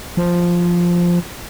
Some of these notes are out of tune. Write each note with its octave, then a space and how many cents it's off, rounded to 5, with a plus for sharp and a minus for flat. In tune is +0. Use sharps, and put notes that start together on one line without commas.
F3 +0